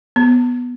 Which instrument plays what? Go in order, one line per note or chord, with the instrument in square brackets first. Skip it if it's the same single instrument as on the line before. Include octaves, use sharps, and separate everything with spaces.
[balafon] B3